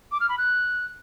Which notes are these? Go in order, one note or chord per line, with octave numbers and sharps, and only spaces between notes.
D6
F6
B5
F#6